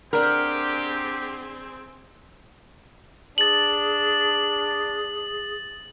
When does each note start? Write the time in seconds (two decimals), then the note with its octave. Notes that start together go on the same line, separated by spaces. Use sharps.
0.13 C4 D4 G4 G#4 A#4 F#5
3.38 D4 G#4 A6 F#7